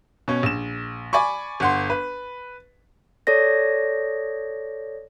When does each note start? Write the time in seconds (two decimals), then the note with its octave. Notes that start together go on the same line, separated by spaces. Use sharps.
0.28 B2 C#4
0.43 A#1 E7
1.13 D5 G#5 B5 C#6
1.60 G1 F#5 C6
1.90 B4
3.27 A4 C#5 D5 A#6